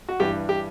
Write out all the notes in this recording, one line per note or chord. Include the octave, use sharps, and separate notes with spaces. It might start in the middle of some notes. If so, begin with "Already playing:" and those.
F#4
G2 E3 G4
G4